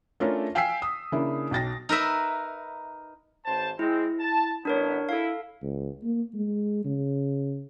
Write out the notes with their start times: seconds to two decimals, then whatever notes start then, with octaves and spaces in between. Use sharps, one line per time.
0.20 A3 C#4 D4 F4 A4 A#4
0.55 F5 G5 G#5 E6 B6 C7
0.82 D#6
1.12 C#3 A#3 D4 E4
1.51 B1 G5 A6 A#6
1.89 D#4 A#4 B4 E5
3.46 A1 C5 A5
3.79 G#3 C4 E4
4.20 A5
4.65 A1 B3 D4 A#4 C#5
5.09 E4 A4 F5
5.63 C#2
6.03 A#3
6.34 G#3
6.85 C#3